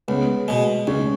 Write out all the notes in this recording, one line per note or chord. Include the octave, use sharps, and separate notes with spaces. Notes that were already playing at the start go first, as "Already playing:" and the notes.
C#2 B3
B2 G#3
C#2 C#4